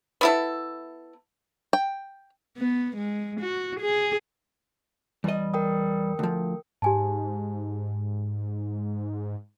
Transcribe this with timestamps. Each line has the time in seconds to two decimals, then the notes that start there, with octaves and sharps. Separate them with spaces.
0.21 B3 E4 A4
1.73 G5
2.58 B3
2.97 G#3
3.41 F#4
3.80 G#4
5.24 E2 G3 D#5
5.54 A#4 G5 D#6
6.19 D2 F3
6.82 G#2 G4 G#5 A5